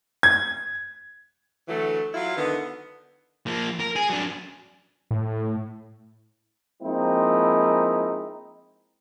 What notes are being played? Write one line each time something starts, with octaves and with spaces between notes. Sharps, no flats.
G#6
D3 E3 F#3 A3
F#3 E4 F4
D3 D#3 B3
F3 A#3
A#4
G#4
F#3 D4
A2
F3 G#3 A#3 C4 D#4 E4